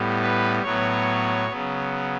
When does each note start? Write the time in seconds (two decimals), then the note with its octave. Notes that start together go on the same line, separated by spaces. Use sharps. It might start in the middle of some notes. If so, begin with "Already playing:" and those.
Already playing: A2 G3 B3
0.21 B4
0.63 A2 F#3 B3 C#5
1.48 C#3 F#3 B3